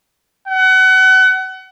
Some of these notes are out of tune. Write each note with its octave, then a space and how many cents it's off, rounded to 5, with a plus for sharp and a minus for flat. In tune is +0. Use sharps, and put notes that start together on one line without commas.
F#5 +30